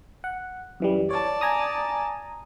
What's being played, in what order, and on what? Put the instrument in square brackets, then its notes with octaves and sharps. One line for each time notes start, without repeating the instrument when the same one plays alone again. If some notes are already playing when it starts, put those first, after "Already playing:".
[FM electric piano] F#5
F#2 E3 G3
[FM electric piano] C#5 [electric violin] D5 A5
[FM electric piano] G#5 A#5 D#6